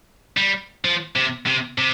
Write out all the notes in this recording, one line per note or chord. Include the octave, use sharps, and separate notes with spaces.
G3
F3
C3
C3
C3